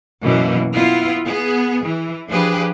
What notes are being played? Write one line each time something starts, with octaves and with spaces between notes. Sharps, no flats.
F#2 B2 E3 A#3
B3 E4 F4
B3 G#4
E3
F3 D4 G4 G#4 B4